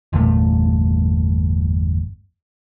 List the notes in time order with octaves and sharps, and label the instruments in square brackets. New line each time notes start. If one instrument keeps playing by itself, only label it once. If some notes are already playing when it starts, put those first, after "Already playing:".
[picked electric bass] G1 E2 A#2 A3